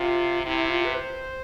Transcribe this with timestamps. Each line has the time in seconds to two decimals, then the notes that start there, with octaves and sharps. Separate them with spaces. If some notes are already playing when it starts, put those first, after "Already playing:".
Already playing: C3 F4
0.45 C3 E4
0.70 F4
0.85 B4
0.94 C5